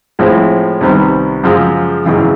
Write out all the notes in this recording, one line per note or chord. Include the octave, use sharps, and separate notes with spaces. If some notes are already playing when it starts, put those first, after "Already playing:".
A2 F3 G#3 C4 E4
C2 C3 D#3 G3 B3
F#2 C#3 F3 G#3
G#1 F#2 C#3 E3